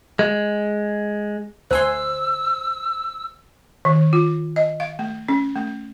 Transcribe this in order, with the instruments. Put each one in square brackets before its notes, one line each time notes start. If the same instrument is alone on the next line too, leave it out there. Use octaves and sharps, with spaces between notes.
[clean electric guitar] G#3
[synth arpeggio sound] D2 G#5 C6 [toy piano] C5 [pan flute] E6
[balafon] D#3
F4
D#5
F5
A3
C#4
A3